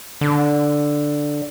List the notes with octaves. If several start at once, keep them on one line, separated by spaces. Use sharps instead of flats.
D3